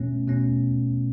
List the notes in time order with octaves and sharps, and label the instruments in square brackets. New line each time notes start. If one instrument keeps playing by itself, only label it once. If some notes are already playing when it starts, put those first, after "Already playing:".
Already playing: [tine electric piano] B2 A3 C#4
B2 A3 C#4